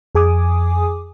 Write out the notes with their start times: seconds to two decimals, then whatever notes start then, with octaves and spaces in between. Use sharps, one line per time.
0.15 F2 G#4 G#5 D6 D#6